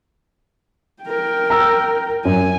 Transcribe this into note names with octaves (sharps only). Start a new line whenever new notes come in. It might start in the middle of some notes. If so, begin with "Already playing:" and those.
A#4 G5
A#5 E6
F#2 G#5